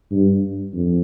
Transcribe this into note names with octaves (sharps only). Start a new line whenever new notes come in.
G2
F2